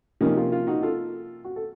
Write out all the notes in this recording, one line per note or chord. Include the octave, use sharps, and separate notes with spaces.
C3 F3 A#3 C#4 D#4
F4
F4
D#4 F#4
F4 A4
F#4
A4